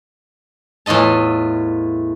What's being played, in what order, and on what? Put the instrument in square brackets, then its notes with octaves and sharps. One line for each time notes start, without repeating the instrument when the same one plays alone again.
[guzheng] E2 A2 F4 D#5 A5